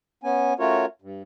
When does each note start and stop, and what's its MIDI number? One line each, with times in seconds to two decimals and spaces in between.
0.23 0.54 59
0.23 0.54 61
0.23 0.54 80
0.59 0.86 57
0.59 0.86 61
0.59 0.86 65
0.59 0.86 66
0.59 0.86 70
0.59 0.86 73
1.02 1.22 43